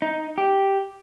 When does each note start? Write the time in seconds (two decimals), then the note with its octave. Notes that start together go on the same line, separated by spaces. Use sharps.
0.02 D#4
0.38 G4